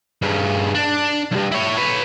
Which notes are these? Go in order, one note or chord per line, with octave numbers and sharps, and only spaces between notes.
G2 C#3
D4
B1 G2
E4 C#5
B4 C#5